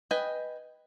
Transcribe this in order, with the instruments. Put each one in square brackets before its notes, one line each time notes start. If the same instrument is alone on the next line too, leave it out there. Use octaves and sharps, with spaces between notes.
[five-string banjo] B4 D#5 G5 G#5